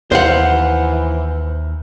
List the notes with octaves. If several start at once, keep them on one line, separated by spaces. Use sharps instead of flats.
D#2 E3 C5 F5 F#5